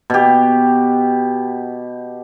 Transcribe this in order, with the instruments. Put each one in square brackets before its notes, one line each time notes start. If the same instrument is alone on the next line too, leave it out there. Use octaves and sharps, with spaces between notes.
[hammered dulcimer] B2 G4